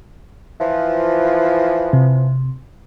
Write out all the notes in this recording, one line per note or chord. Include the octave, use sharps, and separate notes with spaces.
E3 F3
C3